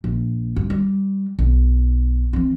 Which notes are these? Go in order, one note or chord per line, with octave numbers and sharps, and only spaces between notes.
A#1
G2
G3
B1
E3 C4